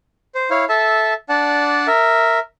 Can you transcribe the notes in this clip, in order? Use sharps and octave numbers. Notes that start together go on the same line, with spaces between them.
C5
E4 C#5 F5
A4 E5 A5
D4 D5 F#5 A5
A#4 E5